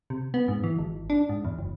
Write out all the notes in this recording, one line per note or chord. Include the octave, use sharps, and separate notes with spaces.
C3
B3
G#2
E3
G#1
D4
G#2
E2
F#1